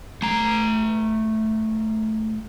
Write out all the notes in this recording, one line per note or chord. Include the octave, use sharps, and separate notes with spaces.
A3 A#5